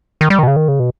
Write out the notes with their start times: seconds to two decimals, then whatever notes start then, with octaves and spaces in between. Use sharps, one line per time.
0.21 D#3
0.30 G3
0.39 D#3
0.43 B2
0.47 C#3
0.56 D#3
0.68 C#3
0.80 B2